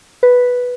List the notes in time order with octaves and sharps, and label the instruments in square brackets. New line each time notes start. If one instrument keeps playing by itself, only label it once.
[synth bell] B4